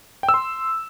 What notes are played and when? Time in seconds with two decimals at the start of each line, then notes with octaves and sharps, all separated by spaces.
0.23 G5
0.29 E6
0.34 C6